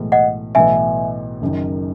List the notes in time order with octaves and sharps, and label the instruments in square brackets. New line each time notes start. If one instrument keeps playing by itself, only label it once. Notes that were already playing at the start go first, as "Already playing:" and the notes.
Already playing: [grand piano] B1 A2 E3 G#3
[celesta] D#5 F#5
[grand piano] B1 A2 E3 B3 [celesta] E5 G#5
[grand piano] F#1 F#2 D#3